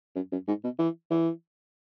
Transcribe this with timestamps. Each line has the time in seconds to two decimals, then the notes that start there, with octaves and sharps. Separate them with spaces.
0.15 F#2
0.32 F#2
0.48 G#2
0.64 B2
0.79 E3
1.11 E3